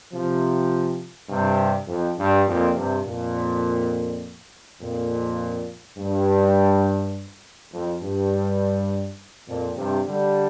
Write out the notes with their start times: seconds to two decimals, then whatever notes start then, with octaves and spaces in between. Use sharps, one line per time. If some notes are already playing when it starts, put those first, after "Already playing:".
0.12 C3 F3
1.29 G2 C3
1.87 F2
2.17 G2
2.46 F2 A#2
2.75 G2 C3
3.04 F2 A#2
4.80 F2 A#2
5.97 G2
7.72 F2
8.01 G2
9.47 F2 A#2
9.76 G2 C3
10.06 D3 G3